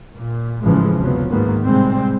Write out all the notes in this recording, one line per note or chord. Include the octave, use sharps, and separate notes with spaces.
A#2
A1 G#2 C#3 E3 F3 G#3
F#1 D2 C3 F3 F#3 B3
G#1 G#2 D#3 A#3 B3
A2 C3 G3 G#3 C4